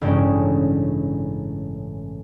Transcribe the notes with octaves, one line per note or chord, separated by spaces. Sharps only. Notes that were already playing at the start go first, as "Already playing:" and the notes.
A1 G2 C#3 G#3 C#4 G5